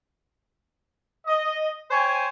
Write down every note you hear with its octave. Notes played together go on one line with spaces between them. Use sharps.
D#5
C5 C#5 G5 G#5